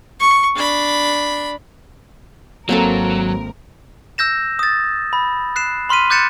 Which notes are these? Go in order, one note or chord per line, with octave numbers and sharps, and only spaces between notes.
C#6
D4 B5
G#1 F#3 A#3 C4 A4 A#4
E6 G6 A#6 E7
D#6 A6
B5
F#6 C7 E7
B5 C6 F6 B6 D#7
D6 F#6 G6 A6 C#7 E7